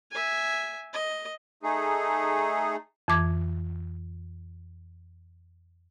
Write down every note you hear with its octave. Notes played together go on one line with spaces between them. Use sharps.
E5 G#5
D#5
A3 D#4 G#4
F2 E3 D6 G#6